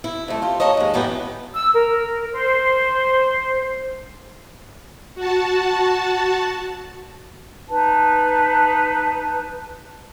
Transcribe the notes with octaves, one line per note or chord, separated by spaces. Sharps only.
E4
F2 A3
F4 G4
A#3 A4 C#5 D#5
D#2 G#3
F#2 A2 E3 B3 G4
E6
A#4
C5
F#4 A5
D#4 B4 A5